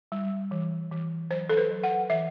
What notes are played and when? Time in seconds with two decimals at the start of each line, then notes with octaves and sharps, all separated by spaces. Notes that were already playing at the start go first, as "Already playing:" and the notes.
0.12 G3
0.51 E3
0.91 E3
1.31 F#3 C5
1.49 A4
1.57 B4
1.71 F#3
1.83 F#5
2.10 E3 E5